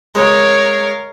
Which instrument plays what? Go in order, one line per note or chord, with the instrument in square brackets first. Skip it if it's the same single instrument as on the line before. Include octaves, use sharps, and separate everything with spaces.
[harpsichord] G#3 [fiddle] A#4 F5 [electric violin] C#5